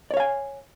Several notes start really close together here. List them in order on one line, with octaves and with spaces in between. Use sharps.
D5 C#5 F5 G#5